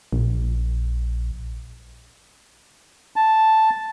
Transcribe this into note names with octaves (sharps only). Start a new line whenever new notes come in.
A#1
A5